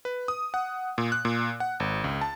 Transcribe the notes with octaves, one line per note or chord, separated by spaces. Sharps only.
B4
D#6
F#5
A#2
F#6
A#2
F#5
G#1
C#2
A5